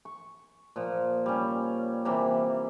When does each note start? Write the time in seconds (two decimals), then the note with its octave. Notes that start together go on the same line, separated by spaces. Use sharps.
0.05 C#6
0.76 A#2 F3
1.26 G3 C#4
2.05 C3 E3 G3 A#3